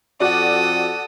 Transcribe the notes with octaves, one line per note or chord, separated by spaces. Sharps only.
F2 F#4 A4 D5 D#6